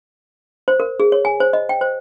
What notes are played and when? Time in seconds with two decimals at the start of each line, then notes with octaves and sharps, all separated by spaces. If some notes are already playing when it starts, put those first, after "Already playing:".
0.68 C5
0.80 A#4
1.00 G#4
1.12 C#5
1.25 G#5
1.40 C5
1.53 D#5
1.69 G5
1.81 C5